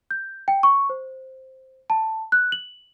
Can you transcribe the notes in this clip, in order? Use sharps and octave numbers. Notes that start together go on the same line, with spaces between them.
G6
G5
C#6
C5
A5
F#6
F#7